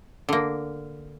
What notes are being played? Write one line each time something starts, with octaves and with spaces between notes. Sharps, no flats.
D3 A#3